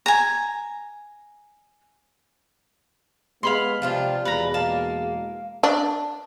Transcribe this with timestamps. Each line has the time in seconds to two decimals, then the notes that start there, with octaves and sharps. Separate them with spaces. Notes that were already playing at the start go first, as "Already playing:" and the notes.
0.06 G#5 A#5
3.43 G#3 B3 G#4 F5 B5 C6
3.82 C3 F3 D4 F4
4.25 E2 B2 G#3 B4 A#5
4.54 A#3 A5
5.63 D4